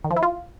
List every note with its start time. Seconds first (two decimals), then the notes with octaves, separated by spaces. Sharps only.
0.05 D#3
0.11 F3
0.17 E4
0.23 F4